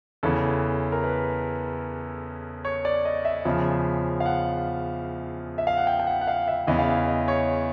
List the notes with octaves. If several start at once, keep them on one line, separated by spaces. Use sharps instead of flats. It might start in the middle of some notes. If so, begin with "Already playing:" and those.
E2 C#3 E3 A4
A#4
B4
C#5
D5
D#5
E5
E2 C#3 F3
F5
F#5
E5
F5
F#5
G5
G5
F#5
F#5
F5
E5
E2 C#3 E3 D#5
F5
E5
D#5
C#5